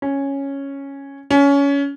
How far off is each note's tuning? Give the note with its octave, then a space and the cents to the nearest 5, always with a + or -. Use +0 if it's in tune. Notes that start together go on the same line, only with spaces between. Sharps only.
C#4 -5
C#4 +20